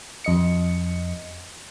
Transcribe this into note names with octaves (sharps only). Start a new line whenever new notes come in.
F2 D#5 C#7